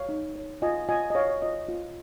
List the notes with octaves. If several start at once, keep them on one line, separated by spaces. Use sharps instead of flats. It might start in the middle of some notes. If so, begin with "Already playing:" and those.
Already playing: C#5 F5
D#4
C#5
F4 D#5 G#5
F4 D#5 G#5
D#5
C#5 F5
F4 D#5
F4